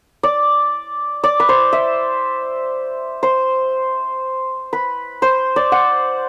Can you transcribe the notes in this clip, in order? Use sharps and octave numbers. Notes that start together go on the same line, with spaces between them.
D5
D5
B4
C5
E5
C5
B4
C5
D5
F#5